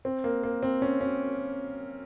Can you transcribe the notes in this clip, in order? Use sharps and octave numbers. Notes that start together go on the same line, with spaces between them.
C4
A#3
A#3
C4
C#4
C#4